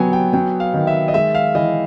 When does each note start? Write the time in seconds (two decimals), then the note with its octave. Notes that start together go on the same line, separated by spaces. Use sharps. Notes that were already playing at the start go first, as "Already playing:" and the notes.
Already playing: F#3 B3 G5 G#5
0.13 G5
0.33 F#3 G5
0.60 F5
0.74 D#3
0.87 E5
1.08 D#5
1.14 G#3 E5
1.35 F5
1.55 E3 D#5